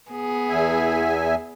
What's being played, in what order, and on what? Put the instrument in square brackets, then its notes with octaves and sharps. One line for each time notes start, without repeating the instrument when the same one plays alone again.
[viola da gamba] B3 G#4
[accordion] E2 E5 G#5